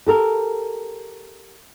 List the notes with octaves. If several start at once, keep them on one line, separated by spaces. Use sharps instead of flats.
G4 A4 A#4